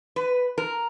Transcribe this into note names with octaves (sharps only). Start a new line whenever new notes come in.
B4
A#4